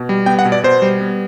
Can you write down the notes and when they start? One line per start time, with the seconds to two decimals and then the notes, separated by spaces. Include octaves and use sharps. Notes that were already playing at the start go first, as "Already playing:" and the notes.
Already playing: B2
0.09 G3
0.26 B3 G5
0.39 F#5
0.45 B2
0.52 D5
0.64 B2 C5
0.82 G3
1.01 B3